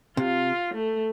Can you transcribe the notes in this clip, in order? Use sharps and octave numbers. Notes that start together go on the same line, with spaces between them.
C3 F4
A3